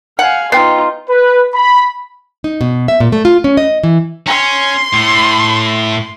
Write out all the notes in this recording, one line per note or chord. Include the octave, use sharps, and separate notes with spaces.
F5 F#5 G#5
B3 D#4 F4 G5 C7
B4
B5
D#4
B2
E5
A#2
A3
F4
C#4
D#5
E3
C#4 C6
A2